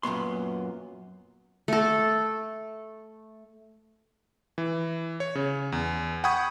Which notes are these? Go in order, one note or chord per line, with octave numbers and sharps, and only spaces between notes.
F#2 A#2 B3 C6
A3 A4
E3
C#5
C#3
E2
F#5 G5 B5 C#6 D#6 G#6